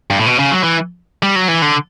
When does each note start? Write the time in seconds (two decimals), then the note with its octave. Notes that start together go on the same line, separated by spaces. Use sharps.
0.10 G2
0.19 A2
0.26 B2
0.39 C#3
0.52 F#3
0.63 E3
1.23 G3
1.36 F#3
1.48 E3
1.62 D3